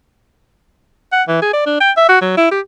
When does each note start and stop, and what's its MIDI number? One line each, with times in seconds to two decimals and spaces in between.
1.12 1.22 78
1.28 1.39 52
1.42 1.52 68
1.53 1.61 74
1.66 1.79 62
1.80 1.91 79
1.97 2.06 76
2.09 2.17 66
2.21 2.37 54
2.37 2.51 64
2.51 2.60 67